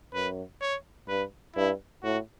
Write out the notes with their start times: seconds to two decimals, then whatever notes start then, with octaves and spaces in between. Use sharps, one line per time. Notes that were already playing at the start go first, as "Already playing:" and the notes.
0.14 F#2 B4
0.61 C#5
1.08 G2 B4
1.56 G2 E4
2.03 A2 F#4